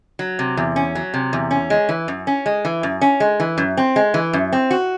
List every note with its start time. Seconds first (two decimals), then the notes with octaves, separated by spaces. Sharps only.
0.19 F#3
0.39 C3
0.57 E2
0.76 C#4
0.95 F#3
1.14 C3
1.33 E2
1.51 C#4
1.70 G#3
1.89 E3
2.08 F#2
2.27 C#4
2.46 G#3
2.65 E3
2.83 F#2
3.01 C#4
3.20 G#3
3.40 E3
3.58 F#2
3.77 C4
3.96 G#3
4.14 E3
4.33 F#2
4.52 C4
4.71 F#4